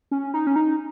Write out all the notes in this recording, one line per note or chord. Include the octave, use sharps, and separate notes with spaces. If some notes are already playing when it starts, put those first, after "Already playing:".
C#4
D#4
C#4
D#4